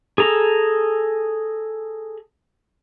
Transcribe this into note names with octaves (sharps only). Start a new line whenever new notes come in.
G#4 A4 A#5